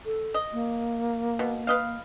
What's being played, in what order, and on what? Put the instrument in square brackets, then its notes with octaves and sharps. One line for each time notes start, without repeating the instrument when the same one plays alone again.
[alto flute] A4
[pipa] D#5
[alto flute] A#3
[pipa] B2
B4 D#5 F5